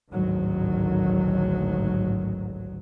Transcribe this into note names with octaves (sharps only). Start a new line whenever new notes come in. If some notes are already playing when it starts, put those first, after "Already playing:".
A1 D2 G#2 D#3 F#3